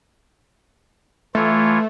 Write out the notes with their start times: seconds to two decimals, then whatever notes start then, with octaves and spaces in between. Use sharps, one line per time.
1.35 E3 A3 F4 C#5